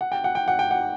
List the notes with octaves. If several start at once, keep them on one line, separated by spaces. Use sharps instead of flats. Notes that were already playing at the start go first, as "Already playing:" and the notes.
F#5
G5
F#5
G5
F#5
G5
F#5